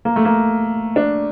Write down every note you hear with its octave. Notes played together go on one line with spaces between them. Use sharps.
A#3
A3
A#3
D4